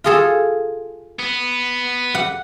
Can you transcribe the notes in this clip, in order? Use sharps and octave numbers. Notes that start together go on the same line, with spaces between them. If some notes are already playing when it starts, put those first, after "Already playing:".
F4 G#4 A4
B3
F#5